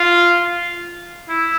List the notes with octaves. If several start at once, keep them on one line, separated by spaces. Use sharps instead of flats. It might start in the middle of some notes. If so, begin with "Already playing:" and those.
Already playing: F4
E4